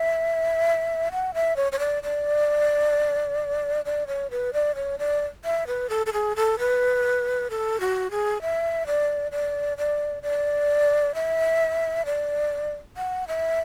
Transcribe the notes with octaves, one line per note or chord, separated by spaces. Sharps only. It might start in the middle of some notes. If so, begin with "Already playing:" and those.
Already playing: E5
F#5
E5
C#5
C#5
D5
D5
D5
C#5
B4
D5
C#5
D5
E5
B4
A4
A4
G#4
A4
B4
A4
F#4
G#4
E5
D5
D5
D5
D5
E5
D5
F#5
E5